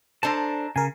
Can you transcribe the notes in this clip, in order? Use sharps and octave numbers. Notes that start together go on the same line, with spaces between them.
D4 A4 C5 A5 A#5
C#3 A#4 G#5